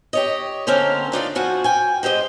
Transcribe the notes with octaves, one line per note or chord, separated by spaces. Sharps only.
G4 C#5 D#5
D3 A#3 C4 C#4 A#4 C5
D4 D#4 F4 D5
F2 F3 F#4 F#5 G#5
G5 G#5
G#3 G4 C5 D#5